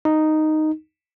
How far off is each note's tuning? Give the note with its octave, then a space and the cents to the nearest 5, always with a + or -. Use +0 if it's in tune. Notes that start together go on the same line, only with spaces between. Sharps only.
D#4 -5